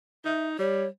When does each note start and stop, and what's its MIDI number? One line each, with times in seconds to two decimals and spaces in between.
0.25 0.56 63
0.25 0.47 76
0.59 0.86 55
0.59 0.87 73